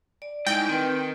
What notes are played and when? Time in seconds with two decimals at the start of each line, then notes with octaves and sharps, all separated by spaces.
0.22 D5
0.47 G#2 G#3 D#4 E4 G5
0.69 D#3 C4 B4